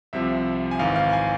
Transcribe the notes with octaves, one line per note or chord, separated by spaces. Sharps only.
C2 C3 F3 E5
G#5
G#1 G#2 E3 F5
F5
G#5